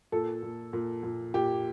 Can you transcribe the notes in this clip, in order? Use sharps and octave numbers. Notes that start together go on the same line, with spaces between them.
A#2 A4
A#2
A#2
A#2
A#2 G4